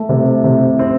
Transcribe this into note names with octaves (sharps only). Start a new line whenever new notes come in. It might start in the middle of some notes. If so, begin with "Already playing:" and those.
Already playing: A3
C3
C3
C4